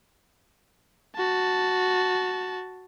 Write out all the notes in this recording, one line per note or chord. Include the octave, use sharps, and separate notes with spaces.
F#4 A5